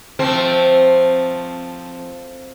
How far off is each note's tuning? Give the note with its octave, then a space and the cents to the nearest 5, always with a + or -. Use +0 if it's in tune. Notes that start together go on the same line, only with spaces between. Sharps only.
F3 +0 A3 +0 C4 +0